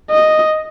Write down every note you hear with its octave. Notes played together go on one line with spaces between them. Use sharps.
D#5